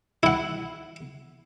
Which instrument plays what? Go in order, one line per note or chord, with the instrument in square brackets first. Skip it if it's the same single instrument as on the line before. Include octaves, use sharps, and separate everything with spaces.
[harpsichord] E4 F#5